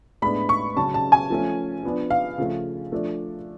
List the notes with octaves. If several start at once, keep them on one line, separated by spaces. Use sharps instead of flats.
A2 G#3 B3 D4 B5
C#6
C#3 F#3 C#4 A5
A5
G#5
F3 A3 C#4
F3 B3 D4
F5
C#3 F3 A3
F3 A3 D4